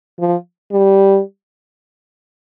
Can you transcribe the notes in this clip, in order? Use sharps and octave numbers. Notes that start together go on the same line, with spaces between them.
F3
G3